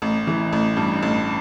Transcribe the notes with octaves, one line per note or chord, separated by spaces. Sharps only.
A1
E3
A1
G2
A1